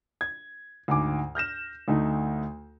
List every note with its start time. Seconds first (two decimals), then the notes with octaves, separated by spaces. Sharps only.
0.21 G#6
0.88 D2 G#2 G#5 D6
1.35 F6 G6 A#6 E7
1.88 D2 A3 D#4